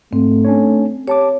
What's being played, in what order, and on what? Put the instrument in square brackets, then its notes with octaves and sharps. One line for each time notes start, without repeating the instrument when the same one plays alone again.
[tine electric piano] G#2 [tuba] A3 [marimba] C4
[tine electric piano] C#4 D4 C#5
[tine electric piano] G4 A5 D6 [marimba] C#5